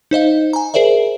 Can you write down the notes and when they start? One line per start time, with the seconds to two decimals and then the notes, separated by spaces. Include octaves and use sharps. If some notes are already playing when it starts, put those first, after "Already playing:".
0.11 D#4 C5 D#5 F5
0.53 G#5 A#5
0.74 G#4 A#4 C5 D5 E5